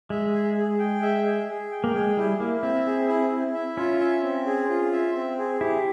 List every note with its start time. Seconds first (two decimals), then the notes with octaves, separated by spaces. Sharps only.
0.10 G#3 E5
0.34 G#4
0.57 G#4
0.79 G5
1.02 E5
1.25 G#4
1.49 G#4
1.71 G5
1.84 A#3
1.94 G#3 G#4
2.17 G3 E4
2.40 A#3 E4
2.62 C4 E5
2.86 G#4
3.08 E4
3.32 E4
3.54 E5
3.77 C#4 F4
4.00 E5
4.23 C4
4.46 G#4
4.69 F4
4.92 E5
5.15 C4
5.38 G#4
5.61 E4 G4